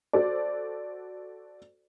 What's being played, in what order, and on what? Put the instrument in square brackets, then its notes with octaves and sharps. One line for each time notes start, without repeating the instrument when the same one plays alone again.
[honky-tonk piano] F#4 A4 C5 D5